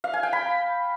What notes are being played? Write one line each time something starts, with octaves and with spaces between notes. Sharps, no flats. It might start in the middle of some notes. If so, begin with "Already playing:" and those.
F5
G#5
G5
B5